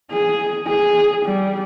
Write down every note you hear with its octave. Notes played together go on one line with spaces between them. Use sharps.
G#4
G#4
G3